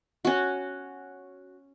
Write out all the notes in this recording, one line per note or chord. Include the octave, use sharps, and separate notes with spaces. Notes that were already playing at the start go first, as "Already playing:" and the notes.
C#4 F#4